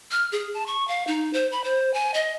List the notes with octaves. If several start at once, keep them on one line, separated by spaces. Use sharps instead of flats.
F6
G#4
A5
C#6
F5
D#4
C5
B5
C5
G#5
D#5